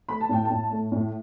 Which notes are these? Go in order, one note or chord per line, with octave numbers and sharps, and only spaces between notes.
A3 B5
A5
A2 G5
A5
A2
A3
A2